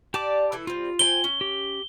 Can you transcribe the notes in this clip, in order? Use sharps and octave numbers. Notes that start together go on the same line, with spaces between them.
G4 D5 A5 D6
E3 E4 A4
G3 C4 F4
C5 G5 G#5 G7
C#4
G4